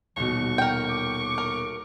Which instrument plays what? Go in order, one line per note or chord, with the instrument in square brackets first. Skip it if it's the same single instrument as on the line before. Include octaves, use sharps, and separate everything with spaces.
[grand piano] D#1 B2 [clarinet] E3 [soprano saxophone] C#6
[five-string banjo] A#4 G5 [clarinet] F#5
[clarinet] D6
[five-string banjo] A#4